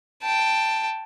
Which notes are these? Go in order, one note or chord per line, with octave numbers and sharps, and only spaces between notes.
G5 A5